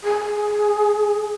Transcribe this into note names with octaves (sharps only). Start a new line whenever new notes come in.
G#4